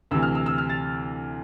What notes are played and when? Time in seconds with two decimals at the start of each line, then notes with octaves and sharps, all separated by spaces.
0.11 D2 C3 E3 E6
0.23 F6
0.35 E6
0.46 E6
0.58 F6
0.70 A6